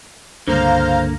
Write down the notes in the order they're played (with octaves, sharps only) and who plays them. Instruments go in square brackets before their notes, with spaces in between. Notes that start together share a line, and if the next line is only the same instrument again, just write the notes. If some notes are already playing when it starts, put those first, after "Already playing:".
[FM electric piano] C#2 G2 [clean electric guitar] D3 A#3 [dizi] C5 [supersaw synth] F5 A#5